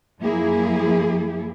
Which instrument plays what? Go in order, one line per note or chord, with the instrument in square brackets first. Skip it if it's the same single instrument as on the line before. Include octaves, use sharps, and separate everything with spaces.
[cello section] F#2 F3 A#3 E4 G#4